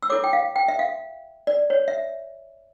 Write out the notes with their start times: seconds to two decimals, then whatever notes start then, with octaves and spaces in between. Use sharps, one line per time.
0.03 E6
0.10 E4 A4 C#5 D6
0.24 G5
0.33 F5
0.56 G5
0.68 E5
0.79 F5
1.47 D5
1.70 C#5
1.88 E5